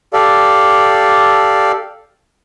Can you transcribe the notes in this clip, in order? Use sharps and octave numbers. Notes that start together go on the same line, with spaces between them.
G4 A4 D5 F5